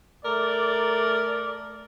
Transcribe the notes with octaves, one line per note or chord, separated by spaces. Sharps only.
A3 A#4 D5